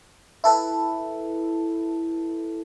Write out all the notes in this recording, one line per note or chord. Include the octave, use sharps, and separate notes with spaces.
E4 A4 B4